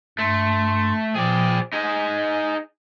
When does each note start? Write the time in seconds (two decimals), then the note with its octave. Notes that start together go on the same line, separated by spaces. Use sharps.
0.19 G2 A3 C6
1.15 A#2 F3 G#4 D5 G5
1.73 D#4 G#4 G#5